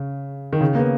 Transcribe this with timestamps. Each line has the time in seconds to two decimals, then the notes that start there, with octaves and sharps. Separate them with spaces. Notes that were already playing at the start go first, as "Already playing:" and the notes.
Already playing: C#3
0.53 D#3
0.61 C#3
0.75 A#3
0.79 B3